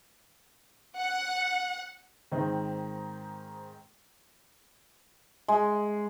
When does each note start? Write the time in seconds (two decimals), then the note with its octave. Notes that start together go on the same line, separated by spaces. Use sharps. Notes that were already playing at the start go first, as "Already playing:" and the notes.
0.99 F#5
2.32 G#2 D#3 C4 D#4
5.48 G#3